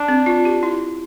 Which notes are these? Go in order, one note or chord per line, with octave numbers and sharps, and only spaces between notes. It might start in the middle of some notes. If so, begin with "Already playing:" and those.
Already playing: D4
C4
F4
G4
E4